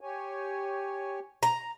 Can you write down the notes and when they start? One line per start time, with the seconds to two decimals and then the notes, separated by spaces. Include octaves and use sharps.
0.01 G4 C#5 G#5
1.43 A#5